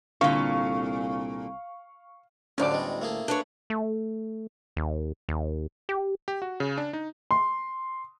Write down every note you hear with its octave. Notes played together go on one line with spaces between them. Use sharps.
C2 A#2 D3 F5 C#6
D2 A2 D3 F3 F#3 C#4 D4 D6
B2 G3 G#3
A3 A#3 G#4
D4 B4 C#5
A3
D#2
D#2
G4
G4
F#4
C#3
D4
D#4
C6